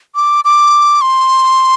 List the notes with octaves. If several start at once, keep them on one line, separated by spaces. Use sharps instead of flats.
D6
D6
C6